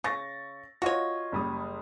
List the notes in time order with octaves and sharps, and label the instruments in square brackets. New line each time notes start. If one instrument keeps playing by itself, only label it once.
[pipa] C#3 [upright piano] C#6 A6 A#6
[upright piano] F4 D#5 [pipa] F#4 C#5
[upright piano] F#1 G3 D#6